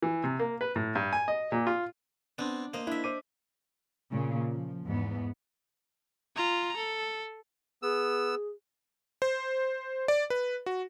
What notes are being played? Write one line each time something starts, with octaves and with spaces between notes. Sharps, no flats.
E3
C3
A#3
B4
A2
G2
G#5
D#5
A#2
F4
B3 C4 D4
A#3 C5 D#5
D4 E4 E5
C5 D6 D#7
A#2 C#3
F3
E2 G#2 B3
F4 A#5
A4
B3 G#4 E6
C5
D5
B4
F#4